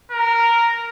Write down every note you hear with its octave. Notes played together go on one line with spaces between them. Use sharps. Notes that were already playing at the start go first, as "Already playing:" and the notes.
A#4